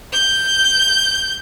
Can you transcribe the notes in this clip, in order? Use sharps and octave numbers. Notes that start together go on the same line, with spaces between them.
G6